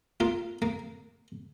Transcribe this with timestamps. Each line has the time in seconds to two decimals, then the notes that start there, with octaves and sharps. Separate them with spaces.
0.20 A#3 F4
0.62 A#3